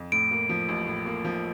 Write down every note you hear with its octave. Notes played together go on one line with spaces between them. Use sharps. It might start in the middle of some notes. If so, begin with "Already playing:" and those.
Already playing: F2
A2 D7
A#3
F3
A1
A2
A#3
F3